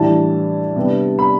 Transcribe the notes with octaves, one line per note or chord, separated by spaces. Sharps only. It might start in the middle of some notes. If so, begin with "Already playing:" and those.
Already playing: A2 E3 G3 D4 A5
C3 G3 B3 D4
B5